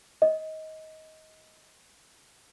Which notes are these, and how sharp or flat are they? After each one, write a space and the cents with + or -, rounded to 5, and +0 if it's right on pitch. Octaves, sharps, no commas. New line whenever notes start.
D#5 +20